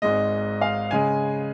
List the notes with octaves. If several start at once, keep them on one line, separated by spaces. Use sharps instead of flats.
G#1 G#2 G#3 D#5
F5
C#3 G#3 G#5